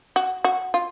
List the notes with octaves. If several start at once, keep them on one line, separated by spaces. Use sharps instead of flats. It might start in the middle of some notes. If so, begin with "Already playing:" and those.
F#4
F#4
F4